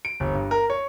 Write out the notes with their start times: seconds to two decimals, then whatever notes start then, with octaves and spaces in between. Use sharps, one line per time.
0.05 D7
0.20 G1
0.35 G2
0.51 A#4
0.70 C#5